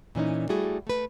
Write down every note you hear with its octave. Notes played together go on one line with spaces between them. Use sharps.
A#2 E3 C#4 D#4
G3 A3 E4 F#4 G#4
A3 B4